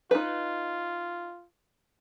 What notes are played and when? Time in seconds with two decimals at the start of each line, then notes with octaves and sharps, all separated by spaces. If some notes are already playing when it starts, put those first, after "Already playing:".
0.11 D#4 F4 B4